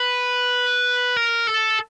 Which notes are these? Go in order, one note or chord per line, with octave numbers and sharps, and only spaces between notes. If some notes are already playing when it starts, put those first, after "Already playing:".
Already playing: B4
A#4
A4